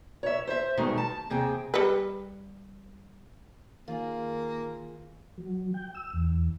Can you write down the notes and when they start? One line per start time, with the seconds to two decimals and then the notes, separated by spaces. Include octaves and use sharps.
0.23 C#5 E5
0.47 C5 E5
0.77 G2 B2 D#3 G#3 A3
0.98 A5
1.30 D#2 C3 G#4 G5
1.74 G3 B4
3.88 D#3 A#3 F4 G#4
5.38 F#3
5.74 G5
5.95 E6
6.13 E2